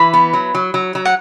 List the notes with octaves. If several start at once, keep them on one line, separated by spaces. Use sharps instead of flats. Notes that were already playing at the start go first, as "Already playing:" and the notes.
Already playing: E3 B5
B3
F#3
F#3
F#3
F#3
F#5